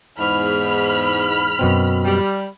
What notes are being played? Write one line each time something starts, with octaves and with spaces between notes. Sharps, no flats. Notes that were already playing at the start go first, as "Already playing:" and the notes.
E2 G#2 B5 F6
F#2 B2 C4
G3